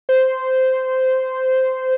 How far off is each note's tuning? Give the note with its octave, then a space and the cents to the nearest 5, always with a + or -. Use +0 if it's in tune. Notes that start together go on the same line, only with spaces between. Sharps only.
C5 -10